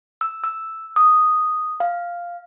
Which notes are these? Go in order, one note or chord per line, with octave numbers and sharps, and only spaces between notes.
E6
E6
D#6
F5